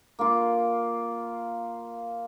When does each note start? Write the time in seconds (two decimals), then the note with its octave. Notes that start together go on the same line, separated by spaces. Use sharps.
0.19 A#3 F4